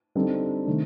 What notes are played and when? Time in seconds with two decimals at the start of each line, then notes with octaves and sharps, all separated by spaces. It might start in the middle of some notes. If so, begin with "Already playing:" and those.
0.15 D3 G3 C4 D#4 A4
0.66 C3 D#3 A3 D4